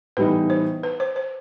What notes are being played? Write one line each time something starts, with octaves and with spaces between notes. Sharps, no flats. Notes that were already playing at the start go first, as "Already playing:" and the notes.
A2 E3 G3 B3 D#4 B4
C5
B4
C5
C5